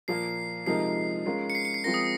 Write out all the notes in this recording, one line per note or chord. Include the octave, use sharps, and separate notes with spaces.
A#2 F3 A#3 C7
C3 F3 G#3 D#4 A#4 C7
G#3 C#4 F4 A#4
C#7
C7
C#7
C7
F3 G#3 C4 F4 A#4 A#6
D#6